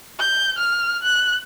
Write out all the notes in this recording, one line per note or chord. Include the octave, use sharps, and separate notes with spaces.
G6
F6
F#6